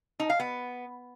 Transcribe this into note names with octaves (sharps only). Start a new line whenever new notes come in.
D#4
F5
B3